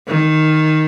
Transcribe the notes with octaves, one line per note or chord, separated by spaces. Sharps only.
D#3